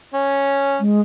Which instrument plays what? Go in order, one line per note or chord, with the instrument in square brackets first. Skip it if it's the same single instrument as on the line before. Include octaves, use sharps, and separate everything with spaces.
[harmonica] C#4
[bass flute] G#3